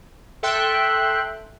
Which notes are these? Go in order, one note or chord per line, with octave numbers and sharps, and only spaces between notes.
A4 E5 G5 C6 F#6